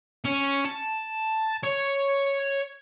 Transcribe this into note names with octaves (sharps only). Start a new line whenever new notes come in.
C#4
A5
C#5